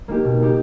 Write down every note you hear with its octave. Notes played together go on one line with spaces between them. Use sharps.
A#3 D#4 G4
B2
A#3 D#4 G4